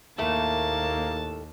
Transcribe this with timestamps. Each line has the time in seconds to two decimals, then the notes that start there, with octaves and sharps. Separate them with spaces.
0.18 D#2 A2 A3 A#3 A5